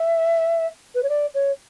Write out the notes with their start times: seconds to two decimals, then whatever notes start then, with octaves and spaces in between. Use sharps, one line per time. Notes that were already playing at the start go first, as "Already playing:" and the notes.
Already playing: E5
0.94 B4
1.03 C#5
1.09 D5
1.34 C#5